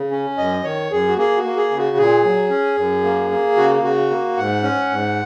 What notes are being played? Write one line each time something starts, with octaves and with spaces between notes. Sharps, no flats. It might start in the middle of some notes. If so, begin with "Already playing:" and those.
Already playing: C#3
C#4
F#2 D#5
D#3 C#5
F#2 G#4
F#4
A#3 G#4
F#4
A#3
G#4
C#3
F#4
A#2 G#4
F#3
C#4
F#2
A#3
A#3
C#3 F#4
C#3 F#4
A#3
G#2 F#5
C#4
G#2